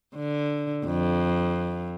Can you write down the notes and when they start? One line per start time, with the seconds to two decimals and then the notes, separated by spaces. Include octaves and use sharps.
0.16 D3
0.86 F2